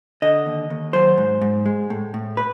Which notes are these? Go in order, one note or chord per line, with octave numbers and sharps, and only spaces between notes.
D3 D#5
D#2
D#2
F#3 C5
G#2
G#2
G#3
A2
A2
B4